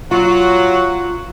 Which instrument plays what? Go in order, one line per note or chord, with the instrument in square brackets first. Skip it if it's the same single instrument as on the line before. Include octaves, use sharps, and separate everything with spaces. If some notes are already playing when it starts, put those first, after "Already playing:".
[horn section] F#3 [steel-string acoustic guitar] F4 [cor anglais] F#4